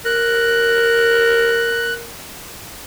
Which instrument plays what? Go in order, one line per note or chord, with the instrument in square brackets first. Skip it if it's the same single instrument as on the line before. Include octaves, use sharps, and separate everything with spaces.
[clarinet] A#4 [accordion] F#6